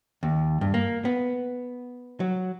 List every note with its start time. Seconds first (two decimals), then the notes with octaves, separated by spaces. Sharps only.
0.23 D#2
0.61 G2
0.74 A#3
1.05 B3
2.20 F#3